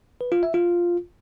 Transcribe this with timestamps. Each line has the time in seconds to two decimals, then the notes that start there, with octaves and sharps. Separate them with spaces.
0.21 B4
0.32 F4
0.43 E5
0.54 F4